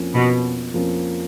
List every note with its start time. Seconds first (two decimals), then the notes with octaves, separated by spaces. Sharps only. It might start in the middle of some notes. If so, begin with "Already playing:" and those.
Already playing: F2 F3 A#3 C#4
0.14 B2
0.73 F2 F3 A#3 C#4